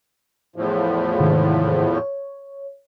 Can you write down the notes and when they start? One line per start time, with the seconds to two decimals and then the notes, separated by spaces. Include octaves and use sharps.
0.56 E2 A2 F3
1.20 G#2 C3 D#3
1.95 C#5